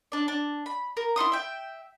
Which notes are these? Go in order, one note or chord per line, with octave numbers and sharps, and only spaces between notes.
D4 D5
D4
B5
A#4
E4 A4 C6 D#6
E5 G5